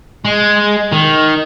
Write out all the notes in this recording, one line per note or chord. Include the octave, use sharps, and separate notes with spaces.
G#3
D#3